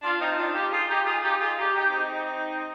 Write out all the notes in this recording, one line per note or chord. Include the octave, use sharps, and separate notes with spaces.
D4 F4
C4 D#4
D4 F4
D#4 G4
F4 G#4
D#4 G4
F4 G#4
D#4 G4
F4 G#4
D#4 G4
D#4 G4
C4 D#4